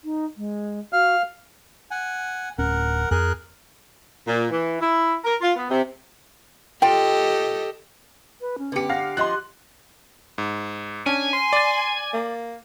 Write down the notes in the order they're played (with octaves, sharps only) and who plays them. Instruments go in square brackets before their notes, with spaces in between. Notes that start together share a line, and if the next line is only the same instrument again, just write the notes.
[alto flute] D#4
G#3
[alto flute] F#4 [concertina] F5 F6
[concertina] F#5 G#5
[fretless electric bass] D1 C#4 [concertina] A#4 F#5
[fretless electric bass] F2 [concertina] G#4 A#4 F#6
[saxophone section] A#2
E3
E4
A#4
F4
B3
C3
[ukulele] F4 G5 [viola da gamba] G4 A4 D#5
[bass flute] B4
C#4
[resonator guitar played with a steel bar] D3 G4 [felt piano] B3 C#7
[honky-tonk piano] F5 [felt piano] F#5 A#6
[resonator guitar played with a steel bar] F3 F4 D#5 [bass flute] G4 [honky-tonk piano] C6 F#6
[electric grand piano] G#2
[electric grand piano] C#4 [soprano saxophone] D4 [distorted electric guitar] G#5
[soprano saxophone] C6
[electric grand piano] D5 A6
[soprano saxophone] A#3